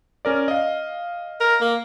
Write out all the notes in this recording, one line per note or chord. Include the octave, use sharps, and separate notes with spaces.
C#4 A#4 D5
D#5 F5
A#4
A#3